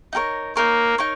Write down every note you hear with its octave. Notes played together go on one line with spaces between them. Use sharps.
D#4 G4 A#4 C#5
A#3 D#4 G4 A#4 C#5
D#4 A#4 C#5